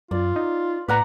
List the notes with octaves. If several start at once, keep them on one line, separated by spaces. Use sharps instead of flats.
F#2 F4 D5
D#4
A2 B4 D5 F#5 A#5